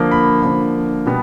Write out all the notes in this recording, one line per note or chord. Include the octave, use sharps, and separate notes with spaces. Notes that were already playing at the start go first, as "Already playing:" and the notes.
Already playing: D3 F3 A#3
B5
D3 F3 A#3
B2 G3 B3